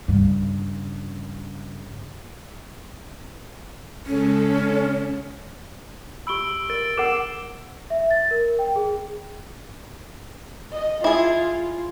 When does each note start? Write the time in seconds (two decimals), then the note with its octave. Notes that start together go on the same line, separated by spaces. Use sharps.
0.08 G2 C#3
4.06 C#3 G#3 C#4 A4
6.27 G4 B5 E6 D7 G7
6.70 A#4 A6 D7
6.97 G#4 A#4 F#5 E7
7.90 E5
8.11 A6
8.31 A#4
8.59 G5
8.76 G#4
10.72 D#5
11.04 E4 F4 G#4